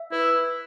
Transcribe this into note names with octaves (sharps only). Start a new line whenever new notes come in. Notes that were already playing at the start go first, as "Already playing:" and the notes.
Already playing: E5
E4 B4